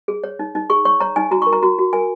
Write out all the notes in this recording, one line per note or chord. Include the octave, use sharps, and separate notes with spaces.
G#4
C#5
D#4
D#4
G#4 C#6
C#5 C#6
C#5 A#5
D#4 G#5
F#4 A#5
C#6
A#4
A#5
F#4 A#5
F#4
A#4 G#5